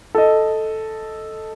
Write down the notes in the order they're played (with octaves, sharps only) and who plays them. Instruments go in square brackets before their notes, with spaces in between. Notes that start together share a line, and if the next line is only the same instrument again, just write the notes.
[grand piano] A4 D#5